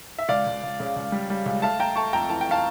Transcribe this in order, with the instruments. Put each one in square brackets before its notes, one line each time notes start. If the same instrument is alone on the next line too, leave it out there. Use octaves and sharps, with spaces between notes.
[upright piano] E5
C#2 D5 F5
C#2
C#2
C#3
C#2
G3
G3
C#2
A3 F5 A5
A3 G5 A#5
A3 A5 C#6
F2 G5 A#5
E3 A5
G5
F5 A5